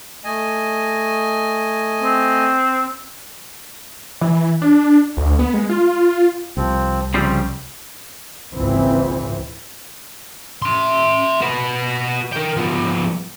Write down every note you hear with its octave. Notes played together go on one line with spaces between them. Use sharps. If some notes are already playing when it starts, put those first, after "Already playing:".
A3 D#5 G#5
C4
E3
D4
D2
B3
G#3
F4
C2 F3 C4
C#3 F3 G3 C4
G#1 C#2 A#2 C#3 E3 C4
E5 C6
F#4 B4
A#4 G5
F3 B3